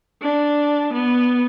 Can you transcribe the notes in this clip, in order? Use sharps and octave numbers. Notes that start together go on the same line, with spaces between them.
D4
B3